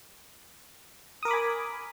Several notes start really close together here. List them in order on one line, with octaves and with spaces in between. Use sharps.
D#6 A#4 D6 B5 G#5